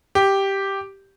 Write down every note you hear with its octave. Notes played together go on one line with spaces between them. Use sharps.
G4